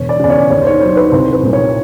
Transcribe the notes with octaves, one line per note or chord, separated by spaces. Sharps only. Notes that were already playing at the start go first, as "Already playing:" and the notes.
Already playing: E1 C#5
D5
E2 C#3 D5
C#5
D#2 C#5
C5
C#5
D#3 F#3 C5
B4
C2 C5
B4
A#2 G3 A#3
C#5